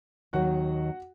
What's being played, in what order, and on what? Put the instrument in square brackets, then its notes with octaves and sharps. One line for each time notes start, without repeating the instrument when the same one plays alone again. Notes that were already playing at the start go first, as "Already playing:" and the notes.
[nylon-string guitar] D#2 D#3 F#3 [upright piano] F#4 F#5